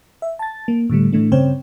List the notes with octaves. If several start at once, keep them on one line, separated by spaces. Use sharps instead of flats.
E5
A5 A6
A#3
A2 D3 G3 A3
A2 E3 A3 D4
G2 C#3 C4 C5 C#5 G5